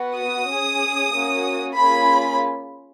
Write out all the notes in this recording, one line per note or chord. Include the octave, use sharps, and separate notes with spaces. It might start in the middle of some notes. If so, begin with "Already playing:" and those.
Already playing: B3 F#4
D#6
C#4 G#4
A#3 C#4 F#4
A#3 C#4 F4 G#4 B5